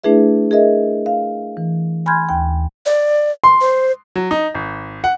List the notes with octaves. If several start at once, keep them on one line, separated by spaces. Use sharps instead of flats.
A3 D4 E4 G#4 B4 E5
G#4 A#4 D#5 E5
F5
E3
G#5 B5 C6 F6 G6 G#6
D#2 G5
D5
C6
C5
F#3
D#4
G#1
F#5